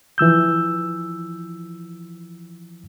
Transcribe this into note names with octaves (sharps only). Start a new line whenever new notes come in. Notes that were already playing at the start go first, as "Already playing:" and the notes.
E3 F3 E6 G6